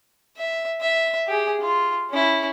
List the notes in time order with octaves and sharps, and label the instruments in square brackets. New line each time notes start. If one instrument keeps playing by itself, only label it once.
[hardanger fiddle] E5
E5
G4 G#4
F4
C#4 E4